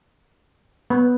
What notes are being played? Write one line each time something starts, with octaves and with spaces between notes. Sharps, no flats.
B3